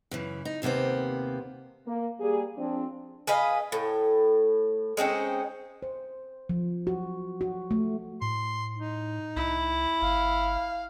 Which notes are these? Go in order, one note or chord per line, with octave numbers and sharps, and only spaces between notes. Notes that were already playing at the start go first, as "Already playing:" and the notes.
F#2 C#3 E3
D#4
D#2 C3 A#3 B3 C5
A#3
G3 A#3 G#4
F3 C4 D4
G#4 B4 D#5 F5
A2
G#3 C4 C#4 D#4
C5
F3
F#4
F#4
A3
A2 C6
D#4
C2 E4
G1 F5